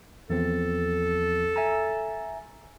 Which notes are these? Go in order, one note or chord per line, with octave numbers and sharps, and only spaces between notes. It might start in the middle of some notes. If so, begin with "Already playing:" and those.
E2 F3 C4 A4
E5 G#5 A#5